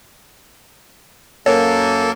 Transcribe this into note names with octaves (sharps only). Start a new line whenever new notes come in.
F#2 F#3 A#3 A4 C#5